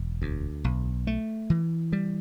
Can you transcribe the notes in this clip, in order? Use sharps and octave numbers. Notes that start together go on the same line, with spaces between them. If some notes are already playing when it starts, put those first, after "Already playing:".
Already playing: E1
D2
B1
A3
E3
G3